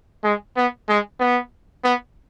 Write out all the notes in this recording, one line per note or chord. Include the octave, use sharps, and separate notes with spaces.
G#3
B3
G#3
B3
B3